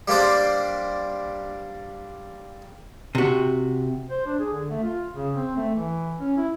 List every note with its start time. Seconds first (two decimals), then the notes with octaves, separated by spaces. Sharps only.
0.08 G3 A#3 D4 C5 D5
3.15 C3 F#4
4.10 C5
4.26 D4
4.39 G#4
4.52 D3
4.70 A3
4.83 F4
5.14 C#3
5.36 C4
5.56 A3
5.75 E3
6.20 C#4
6.37 E4